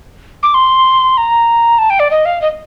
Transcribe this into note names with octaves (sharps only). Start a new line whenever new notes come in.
D6
C6
A#5
A5
G5
D5
D#5
F5
D#5